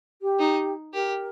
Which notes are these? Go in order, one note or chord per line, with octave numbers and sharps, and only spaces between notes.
G4
D#4
G4 A#4